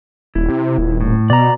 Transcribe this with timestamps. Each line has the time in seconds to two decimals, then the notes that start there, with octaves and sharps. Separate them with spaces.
0.35 D#1 E4
0.49 C3
0.78 D#1
1.01 A2
1.30 B2 D5 A#5